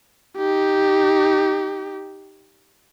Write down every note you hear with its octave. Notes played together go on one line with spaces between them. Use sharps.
D#4 G4